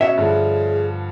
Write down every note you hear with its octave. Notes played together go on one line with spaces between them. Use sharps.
B2 C#4 C#5 D#5 E5
G2 D3 F3 G#4